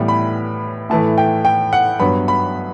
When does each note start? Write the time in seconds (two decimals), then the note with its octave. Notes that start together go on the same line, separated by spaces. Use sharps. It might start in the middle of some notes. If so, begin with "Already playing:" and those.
Already playing: A2 E3 G3 B3
0.08 B5
0.90 A2 E3 A3 A5
1.18 G5
1.45 G5
1.73 F#5
2.00 G2 F#3 B3 B5
2.28 B5